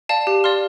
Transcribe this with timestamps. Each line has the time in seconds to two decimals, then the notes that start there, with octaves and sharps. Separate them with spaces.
0.09 D5 F5 A5
0.27 G4
0.44 D5 F5 C6 F6